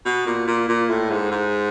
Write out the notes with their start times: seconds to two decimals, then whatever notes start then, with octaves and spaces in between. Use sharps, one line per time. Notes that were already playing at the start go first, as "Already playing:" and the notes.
0.05 B2
0.26 A#2
0.47 A#2
0.68 A#2
0.89 A2
1.10 G#2
1.31 G#2